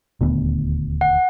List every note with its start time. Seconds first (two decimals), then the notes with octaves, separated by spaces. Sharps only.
0.21 D#1 D2 B3
1.01 F#5